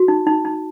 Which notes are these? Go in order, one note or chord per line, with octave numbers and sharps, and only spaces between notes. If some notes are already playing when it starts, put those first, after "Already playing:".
Already playing: F#4
D#4
D#4
D#4